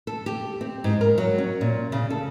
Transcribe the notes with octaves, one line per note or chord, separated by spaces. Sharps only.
A4
G4
C4
G#2
A#4
F#3
C#4
A#2
C#3
A4